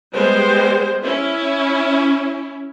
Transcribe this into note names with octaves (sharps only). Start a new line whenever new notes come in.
G3 G#3 B3 C5
C#4 E4